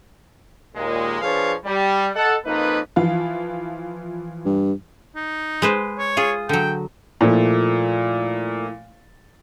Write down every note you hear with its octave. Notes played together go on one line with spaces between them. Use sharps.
D#2 A#2 G#3
F3 D4 G#4 B4 C#5 F5
G3
A4 D#5 F#5
F2 A#3 D#4 B4
E3 F3 F4
G2
D#4
G#3 B4 C5
C#5
F4 G#4
D3 F#3 G5
A#2 F3 A3 E4